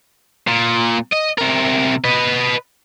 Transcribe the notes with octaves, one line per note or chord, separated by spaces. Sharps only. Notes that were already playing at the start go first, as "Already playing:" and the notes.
A#2
D#5
C3 A#4
B4 D#5